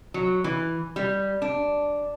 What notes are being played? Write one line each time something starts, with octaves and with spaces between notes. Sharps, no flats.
F#3
E3
G3
D4